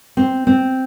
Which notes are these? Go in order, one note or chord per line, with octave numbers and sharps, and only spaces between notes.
C4
C4